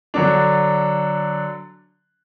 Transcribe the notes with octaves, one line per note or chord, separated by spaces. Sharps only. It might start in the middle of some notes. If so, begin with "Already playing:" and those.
D3 F#3 D4